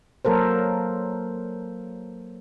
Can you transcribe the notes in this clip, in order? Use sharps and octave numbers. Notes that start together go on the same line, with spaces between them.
F#3 A#3 A4 A#4 C5